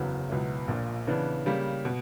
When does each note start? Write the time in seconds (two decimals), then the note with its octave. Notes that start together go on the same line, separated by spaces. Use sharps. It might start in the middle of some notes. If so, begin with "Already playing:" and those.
Already playing: F#1 E2 C#3 F#3 B3
0.29 C#2 B2 F#3 B3 E4
0.67 A#1 A#2 A#3
1.07 C#3 E3 B3 D4
1.46 C#3 G3 A#3
1.85 B2